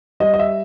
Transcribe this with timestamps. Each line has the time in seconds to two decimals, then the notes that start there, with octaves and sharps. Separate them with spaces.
0.20 G3 D#5
0.34 D#5
0.39 E5